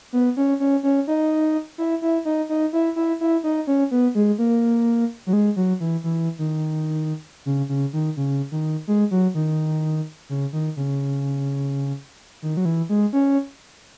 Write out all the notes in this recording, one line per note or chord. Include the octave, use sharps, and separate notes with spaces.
B3
C#4
C#4
C#4
D#4
E4
E4
D#4
D#4
E4
E4
E4
D#4
C#4
B3
G#3
A#3
F#3
G#3
F#3
E3
E3
D#3
C#3
C#3
D#3
C#3
D#3
G#3
F#3
D#3
C#3
D#3
C#3
D#3
F#3
E3
G#3
C#4